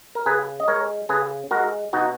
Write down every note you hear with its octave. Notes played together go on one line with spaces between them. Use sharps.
A#4
C#3 G#4 B4
D#5
G#3 A#4 C#5
C#3 G#4 B4
G#3 F#4 A#4
B2 D#4 F#4